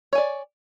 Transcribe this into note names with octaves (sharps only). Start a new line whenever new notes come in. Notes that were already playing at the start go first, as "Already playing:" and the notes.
C#5 D5 G#5